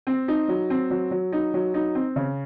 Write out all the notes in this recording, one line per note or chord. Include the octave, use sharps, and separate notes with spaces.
C4
D#4
F#3
C4
F#3
F#3
D#4
F#3
D#4
C4
C#3